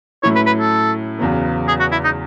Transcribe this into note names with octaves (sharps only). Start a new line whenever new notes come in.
A2 F#3 C#4 E4 C#5
B4
B4
A4
E2 C#3 F#3 B3
G#4
F#4
E4
D#4